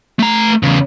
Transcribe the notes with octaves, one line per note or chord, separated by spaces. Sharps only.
A3 A#5
E2 C#3